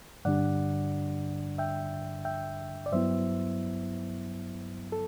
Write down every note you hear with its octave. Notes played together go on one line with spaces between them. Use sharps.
G2 D3 G3 D4 D5 F#5
E5 G5
E5 G5
D5
G2 F#3 B3 E4 C5 E5
A4